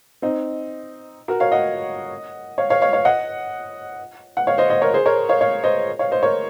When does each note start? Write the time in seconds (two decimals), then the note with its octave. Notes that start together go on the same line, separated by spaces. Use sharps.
0.22 C4 D#4
1.28 F#4 A#4
1.40 C#5 F5
1.52 D#5 F#5
2.58 C#5 F5
2.70 C#5 F5
2.82 C#5 F5
2.93 C#5 F5
3.05 D#5 F#5
4.37 F#5
4.47 C#5 F5
4.58 C5 D#5
4.69 C5 D#5
4.82 A#4 C#5
4.94 G#4 C5
5.06 A#4 C#5
5.29 C#5 F5
5.41 C#5 F5
5.64 C5 D#5
5.99 C#5 F5
6.11 C5 D#5
6.23 A#4 C#5